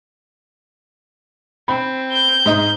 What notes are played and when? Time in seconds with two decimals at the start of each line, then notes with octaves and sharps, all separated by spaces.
1.68 C4 B5
2.13 G6
2.46 G#2 D#5